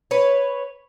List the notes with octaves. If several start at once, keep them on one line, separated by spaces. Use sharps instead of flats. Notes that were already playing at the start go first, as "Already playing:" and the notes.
B4 C#5